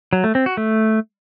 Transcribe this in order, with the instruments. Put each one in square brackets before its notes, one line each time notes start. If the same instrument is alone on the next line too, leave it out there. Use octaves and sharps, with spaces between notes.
[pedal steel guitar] F#3
A3
C4
F#4
A3